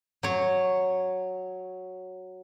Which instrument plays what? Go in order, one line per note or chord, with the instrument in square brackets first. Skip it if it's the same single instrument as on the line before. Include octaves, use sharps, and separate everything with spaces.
[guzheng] F#3 C#5